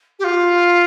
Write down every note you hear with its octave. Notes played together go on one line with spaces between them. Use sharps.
G4
F4